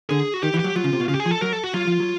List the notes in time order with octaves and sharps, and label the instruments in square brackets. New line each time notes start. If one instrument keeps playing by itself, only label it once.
[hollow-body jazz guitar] D3 [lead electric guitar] G#4
[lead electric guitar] F#4
[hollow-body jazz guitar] D#3 [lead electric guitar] G4
[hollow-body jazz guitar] E3
[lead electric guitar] G4
[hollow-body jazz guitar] F#3
[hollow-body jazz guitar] F#3 [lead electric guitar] F4
[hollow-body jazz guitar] C#3
C3
B2
[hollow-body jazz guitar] C#3 [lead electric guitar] F4
[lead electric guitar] G4
G#4
[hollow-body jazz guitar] F3
[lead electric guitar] A4
[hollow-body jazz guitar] F#3 [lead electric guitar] A#4
[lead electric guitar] A4
F#4
[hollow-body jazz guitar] F#3 [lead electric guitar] F4
[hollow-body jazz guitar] F3
F#3